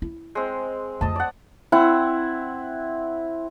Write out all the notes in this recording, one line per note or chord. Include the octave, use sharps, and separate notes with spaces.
E4
G#3 C4
F2 A3 D#5 A5
D5 F#5
C4 E4 F#5